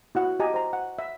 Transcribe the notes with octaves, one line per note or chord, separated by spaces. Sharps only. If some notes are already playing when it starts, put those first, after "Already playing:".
E4 F#4 F#5
G4 D#5 G#5 A#5
C5 A#5
F#5
E5